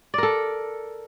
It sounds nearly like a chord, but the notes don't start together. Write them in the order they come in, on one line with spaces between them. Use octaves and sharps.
D5 A#4 A4